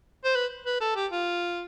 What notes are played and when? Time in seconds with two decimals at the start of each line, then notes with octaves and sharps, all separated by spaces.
0.24 C5
0.35 B4
0.66 B4
0.81 A4
0.96 G4
1.11 F4